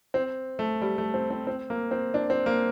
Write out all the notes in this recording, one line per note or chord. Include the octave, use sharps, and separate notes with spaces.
C4
A3
G3
A3
C4
C4
C4
A#3
C4
D4
C4
A#3